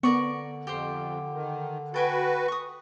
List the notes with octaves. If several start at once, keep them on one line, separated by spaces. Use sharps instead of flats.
D3 B3 A#4 D5 C#6
F2 G4 C5
D#3
F#4 A4 B4 G5 G#5
C#6 D#6